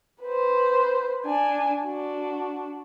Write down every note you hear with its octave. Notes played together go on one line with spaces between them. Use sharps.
B4 C5
D4 G#5
D4 F#4